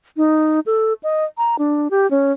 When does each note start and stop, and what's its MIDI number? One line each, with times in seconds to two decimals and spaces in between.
0.17 0.60 63
0.66 0.93 69
1.03 1.25 75
1.38 1.56 82
1.59 1.88 62
1.91 2.09 67
2.11 2.32 61